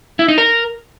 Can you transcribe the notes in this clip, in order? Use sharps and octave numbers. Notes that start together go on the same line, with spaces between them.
E4
D#4
A#4